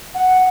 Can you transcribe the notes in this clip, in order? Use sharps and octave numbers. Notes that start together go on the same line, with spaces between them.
F#5